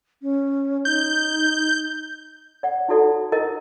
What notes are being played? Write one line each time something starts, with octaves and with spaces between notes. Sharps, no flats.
C#4
D#4 G6
D5 F#5
D#4 E4 F#4 A4 D5 F#5
E4 A#4 D#5